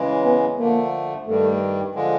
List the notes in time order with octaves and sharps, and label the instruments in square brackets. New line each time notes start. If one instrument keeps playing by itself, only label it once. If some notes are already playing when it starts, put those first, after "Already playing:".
Already playing: [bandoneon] C#3 E3 G#3
[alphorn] B3
[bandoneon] D3 F3 A3 [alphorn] A#3
[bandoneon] G2 D#3 G3 [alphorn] A3
[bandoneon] D3 F3 G#3